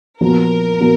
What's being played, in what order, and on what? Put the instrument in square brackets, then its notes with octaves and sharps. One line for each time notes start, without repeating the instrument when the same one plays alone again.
[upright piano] A#2 F3 B3 F#4 [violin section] A#4
[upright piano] A#2 F3 B3 F#4